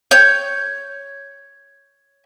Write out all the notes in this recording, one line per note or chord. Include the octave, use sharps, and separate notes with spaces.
C#5 G6